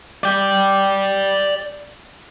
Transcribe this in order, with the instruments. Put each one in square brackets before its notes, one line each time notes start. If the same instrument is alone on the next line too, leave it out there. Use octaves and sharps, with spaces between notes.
[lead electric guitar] D5 G5